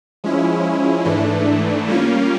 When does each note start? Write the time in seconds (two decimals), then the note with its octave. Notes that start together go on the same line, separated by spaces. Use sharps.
0.24 F3 G#3 C#4 E4
1.05 G#2 E3 A3 D4
1.87 G3 A#3 C#4 F4